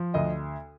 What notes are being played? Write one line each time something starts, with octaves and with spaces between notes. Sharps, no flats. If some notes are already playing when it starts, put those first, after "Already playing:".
Already playing: F3
D2 D#5